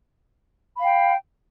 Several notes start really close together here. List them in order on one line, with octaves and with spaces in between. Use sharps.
B5 F5 G5